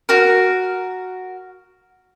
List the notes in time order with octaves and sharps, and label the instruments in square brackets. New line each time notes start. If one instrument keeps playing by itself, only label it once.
[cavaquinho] F#4 A#4